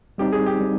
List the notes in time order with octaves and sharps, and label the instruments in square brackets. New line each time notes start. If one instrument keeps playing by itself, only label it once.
[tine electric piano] G3 C4 D#4 [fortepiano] G4
[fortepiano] G#4
G4
[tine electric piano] G3 C4 D#4